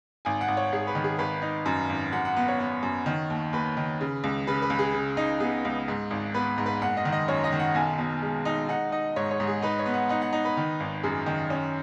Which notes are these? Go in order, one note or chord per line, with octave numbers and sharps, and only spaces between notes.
G#1 G#5
F#5
G#1
C#5
G#1 G#4
B4
D#3
G#4
G#1 B4
D#4
F#2
G#1
F#2 F#5
F#5
B3
C#5
B3
F#2
D#3
D#2
D#2 B4
D#3
C#3
C#2
C#3 B4
B4
C#2
G#4
C#3
D#4
B3 G#4
C#2
G#2
G#1
B3 B4
G#2
B4
F#1 F#5
D#5
D#3
D#5
F#2 C#5
D#5
D#3
F#5
B1 G#5
B2
G#3
D#4
D#4 F#5
D#4 D#5
G#2 C#5
C#5
G#2
G#4
D#4 B4
C#5
B3
F#5
D#4 F#5
F#5
D#4
B4
D#3
G#1
F#2 G#4
D#3
C#4